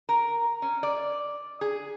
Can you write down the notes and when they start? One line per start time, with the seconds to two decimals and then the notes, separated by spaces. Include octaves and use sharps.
0.09 A#4
0.62 C#4
0.83 D5
1.61 G#4